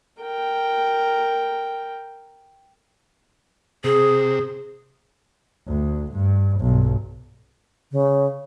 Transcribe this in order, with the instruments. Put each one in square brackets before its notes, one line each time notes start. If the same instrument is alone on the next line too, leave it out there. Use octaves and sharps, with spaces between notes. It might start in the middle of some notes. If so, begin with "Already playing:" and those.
[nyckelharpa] A#4 G5
[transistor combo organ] C3 [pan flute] G#4
[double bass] D2
G2
B1 G2
[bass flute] C#3